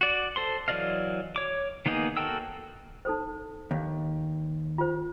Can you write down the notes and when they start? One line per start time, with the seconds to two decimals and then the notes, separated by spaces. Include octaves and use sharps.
0.01 F#4 D5
0.36 A4 C5 C6
0.68 E3 F#3 D5 D#5 F5
1.36 C#5 D6
1.86 D#3 A#3 B3 D#4 G#4
2.17 F#4 A4 A#4 G5 E6
3.05 D#4 A4 C5
3.71 D#2
4.78 F4 C5